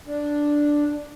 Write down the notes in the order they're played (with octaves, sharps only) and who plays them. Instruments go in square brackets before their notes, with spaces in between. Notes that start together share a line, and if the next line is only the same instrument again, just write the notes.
[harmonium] D4